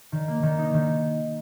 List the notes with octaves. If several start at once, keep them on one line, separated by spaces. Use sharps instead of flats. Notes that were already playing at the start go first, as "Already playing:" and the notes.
D#3
A#3
D#3
D#4
D#3